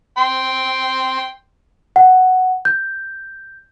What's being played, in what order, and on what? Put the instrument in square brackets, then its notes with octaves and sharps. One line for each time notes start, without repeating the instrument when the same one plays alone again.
[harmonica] G5 C6
[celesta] F#5
G6